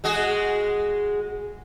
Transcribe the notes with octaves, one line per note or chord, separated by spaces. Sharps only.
G#3 F#4 G#4